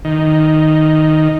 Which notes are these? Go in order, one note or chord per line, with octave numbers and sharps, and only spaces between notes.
D#3